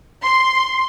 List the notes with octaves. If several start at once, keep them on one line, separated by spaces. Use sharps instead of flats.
C6